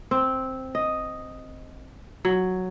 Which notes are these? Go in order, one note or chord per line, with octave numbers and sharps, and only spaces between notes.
C4
D#5
F#3